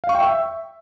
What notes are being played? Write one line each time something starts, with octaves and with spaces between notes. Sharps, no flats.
F5
C#6
G5
E5